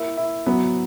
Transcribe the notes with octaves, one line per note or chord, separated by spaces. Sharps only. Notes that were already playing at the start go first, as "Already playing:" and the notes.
Already playing: A#3 E4
E4
F#3 B3